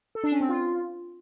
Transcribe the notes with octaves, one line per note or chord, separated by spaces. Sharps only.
A4
D4
C#4
C4
F4